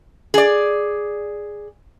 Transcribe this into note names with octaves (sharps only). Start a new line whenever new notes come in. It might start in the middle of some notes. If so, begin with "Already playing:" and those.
G#4 D5